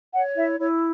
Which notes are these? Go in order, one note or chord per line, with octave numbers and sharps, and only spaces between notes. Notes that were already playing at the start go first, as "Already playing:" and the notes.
C#5 F#5
E4 E5
E4 C#5